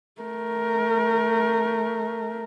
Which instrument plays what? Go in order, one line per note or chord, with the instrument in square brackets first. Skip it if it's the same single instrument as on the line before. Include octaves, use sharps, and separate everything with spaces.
[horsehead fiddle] A3 A#4